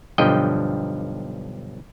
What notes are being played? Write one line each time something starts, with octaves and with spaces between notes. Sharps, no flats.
B1 G2 D3 F3 D#5 G5